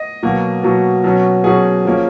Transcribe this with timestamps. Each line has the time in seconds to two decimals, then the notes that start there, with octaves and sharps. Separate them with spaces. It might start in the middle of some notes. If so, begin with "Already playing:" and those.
Already playing: D#5
0.23 B2 F#3 A#3
0.63 B2 F#3 A#3
1.04 B2 F#3 C#4
1.44 B2 F#3 C#4 G#4
1.85 F3 A#3 C#4